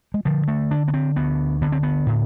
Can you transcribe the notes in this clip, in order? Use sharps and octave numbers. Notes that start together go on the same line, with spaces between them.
G#3
D3 F3
A3
D3 D4
B3
C4
D2 B3
D3 B3
C4
B3
A2